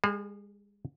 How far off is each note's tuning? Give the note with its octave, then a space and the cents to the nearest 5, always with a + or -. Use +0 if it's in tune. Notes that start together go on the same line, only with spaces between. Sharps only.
G#3 -40 G#4 +30